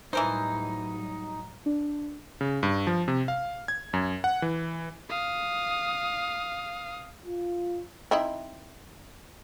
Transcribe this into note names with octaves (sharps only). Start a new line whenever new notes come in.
A2 E3 F#3 G3 D#4 A#4 C5
D4
C#3
G2
F3
C3
F5
G#6
F#2
F#5
E3
F5 D#6
F4
C4 D#4 E4